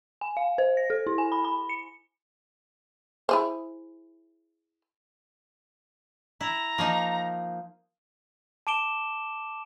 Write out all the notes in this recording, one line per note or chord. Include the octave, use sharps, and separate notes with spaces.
G#5
F5
C5
A#6
A4
E4
G#5
B5
B5
C#7
E4 G#4 C5
E4 A#5
F3 A#3 D#4
A5 D6 D7 E7 G7